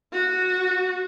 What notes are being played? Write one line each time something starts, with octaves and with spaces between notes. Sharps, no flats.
F#4